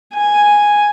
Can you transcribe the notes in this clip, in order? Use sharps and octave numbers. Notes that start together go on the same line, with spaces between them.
G#5